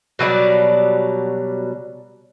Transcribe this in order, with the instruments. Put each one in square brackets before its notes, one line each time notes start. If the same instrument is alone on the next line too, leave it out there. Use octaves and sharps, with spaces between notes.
[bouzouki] B2 F#3 G3 D5